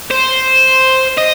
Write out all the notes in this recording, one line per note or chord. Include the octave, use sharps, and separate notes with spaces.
C5
D#5